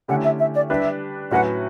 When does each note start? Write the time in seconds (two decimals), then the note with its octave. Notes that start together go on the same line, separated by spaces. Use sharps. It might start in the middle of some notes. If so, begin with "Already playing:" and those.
0.08 D3 A3 C#4 E4 G4 F#5
0.24 E5
0.39 E5
0.54 D5
0.70 G3 D4 G4 B4 E5
1.31 A2 F#3 C#4 F#4 B4 F#5